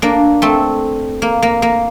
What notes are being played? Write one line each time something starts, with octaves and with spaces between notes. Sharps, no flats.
A#3 D4
A3 C4
A#3
A#3
A#3